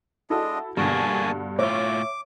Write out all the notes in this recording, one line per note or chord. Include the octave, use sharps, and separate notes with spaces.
G#3 D4 E4 F#4 A4 D#5
G2 B2 D3 A#3 F#4 G#4 A5
A2 F4 C#5 E5 C#6 D6